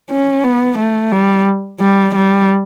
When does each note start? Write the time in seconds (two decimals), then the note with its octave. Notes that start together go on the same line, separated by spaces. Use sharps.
0.10 C#4
0.44 B3
0.78 A3
1.12 G3
1.80 G3
2.15 G3